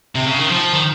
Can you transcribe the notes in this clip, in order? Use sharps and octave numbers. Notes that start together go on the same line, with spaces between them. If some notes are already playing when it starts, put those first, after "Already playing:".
C3
C#3
D#3
F3
D#3